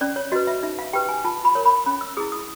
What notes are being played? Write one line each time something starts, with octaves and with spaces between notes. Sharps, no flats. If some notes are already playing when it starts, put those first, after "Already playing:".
C#4 D5
C#5
F#4 B4 D#5
E5
D#4 E5
F5
G4 B4 G5
G#5
F4 A5
B5
A#4 C#5
B5
C#4 B5
E6
E4 G#4 D#6
D#6